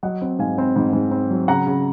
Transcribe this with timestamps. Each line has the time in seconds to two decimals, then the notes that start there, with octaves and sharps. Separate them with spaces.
0.03 F#3 D#5 F#5
0.22 C4
0.39 G#2 F5 G#5
0.58 C4
0.76 G#2
0.93 G#2
1.11 C4
1.31 F#3
1.48 C#3 F#5 A#5
1.67 C#3